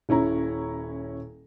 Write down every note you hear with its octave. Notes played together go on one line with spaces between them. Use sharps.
D#1 C#4 E4 A#5